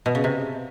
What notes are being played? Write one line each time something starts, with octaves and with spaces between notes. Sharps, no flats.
B2
C#3
C3